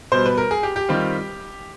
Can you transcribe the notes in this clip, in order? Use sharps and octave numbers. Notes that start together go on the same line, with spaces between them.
B2 G3 B3 C5
B4
A#4
G#4
G4
G4
D#3 G3 C4 F4